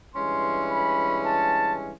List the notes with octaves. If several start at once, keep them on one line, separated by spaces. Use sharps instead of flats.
G2 E3 G#3 C#4 C6
B5
A5